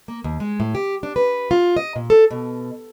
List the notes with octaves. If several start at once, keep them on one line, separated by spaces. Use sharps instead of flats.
A#3
D#2
G#3
A2
G4
D4
B4
F4
D#5
A#2
A4
B2